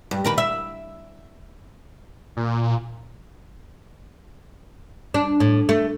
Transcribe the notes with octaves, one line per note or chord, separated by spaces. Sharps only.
G2
D#2 A#4 B4
E5
A#2
D4
A2
A3